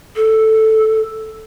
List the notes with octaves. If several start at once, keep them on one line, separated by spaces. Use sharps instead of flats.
A4